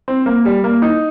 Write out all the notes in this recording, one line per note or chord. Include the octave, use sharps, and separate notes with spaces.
C4
A#3
G3
A#3
D#4